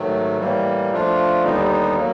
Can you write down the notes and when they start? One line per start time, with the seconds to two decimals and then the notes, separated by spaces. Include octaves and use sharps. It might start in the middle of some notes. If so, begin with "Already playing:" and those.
Already playing: G#2 D#3 F#3 A3
0.38 A2 E3 G3 A#3
0.91 F3 A3 D4 F4
1.43 D#2 D3 G3 B3 D#4
1.96 F#3 A#3